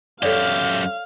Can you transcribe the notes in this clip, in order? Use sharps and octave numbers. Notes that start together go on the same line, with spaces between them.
F#2 G4 A4 C#5 D5 F5